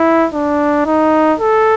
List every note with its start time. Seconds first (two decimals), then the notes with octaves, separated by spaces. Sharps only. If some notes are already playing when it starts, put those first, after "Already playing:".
Already playing: E4
0.34 D4
0.86 D#4
1.40 A4